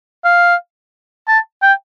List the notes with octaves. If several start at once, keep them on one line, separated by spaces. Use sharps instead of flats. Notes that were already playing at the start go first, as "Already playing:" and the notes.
F5
A5
G5